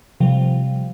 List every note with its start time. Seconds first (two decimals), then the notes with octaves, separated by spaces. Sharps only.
0.20 C3 F3 G3